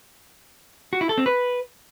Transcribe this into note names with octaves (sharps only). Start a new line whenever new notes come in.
F#4
E4
A4
C4
B4